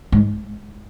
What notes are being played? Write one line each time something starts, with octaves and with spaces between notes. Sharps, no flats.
G#2